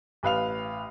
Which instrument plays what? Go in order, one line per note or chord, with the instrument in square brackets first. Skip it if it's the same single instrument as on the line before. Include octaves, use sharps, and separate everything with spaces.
[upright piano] A1 B4 F5 F7